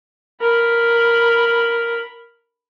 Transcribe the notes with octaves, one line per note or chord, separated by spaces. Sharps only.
A#4 B5